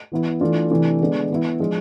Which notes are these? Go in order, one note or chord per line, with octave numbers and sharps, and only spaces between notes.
E3 B3 E4
E3 A3 D4 F4
C3 E3 A3 D4
D3 G#3 B3 D4
E3 B3 E4
F3 G#3 D4 F4